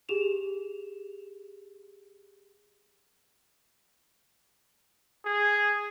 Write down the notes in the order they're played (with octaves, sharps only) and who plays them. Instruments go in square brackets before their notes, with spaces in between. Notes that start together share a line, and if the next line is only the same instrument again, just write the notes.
[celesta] G4 G#4 E7 F7
[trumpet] G#4